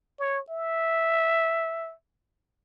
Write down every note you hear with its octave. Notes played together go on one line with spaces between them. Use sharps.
C#5
E5